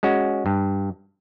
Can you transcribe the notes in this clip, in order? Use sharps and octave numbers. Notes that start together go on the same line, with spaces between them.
G#3 C#4 F#4
G2